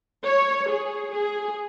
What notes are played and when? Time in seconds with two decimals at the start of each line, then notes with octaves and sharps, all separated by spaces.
0.24 C#5
0.68 G#4
1.12 G#4